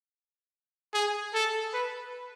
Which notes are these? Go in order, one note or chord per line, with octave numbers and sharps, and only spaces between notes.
G#4
A4
B4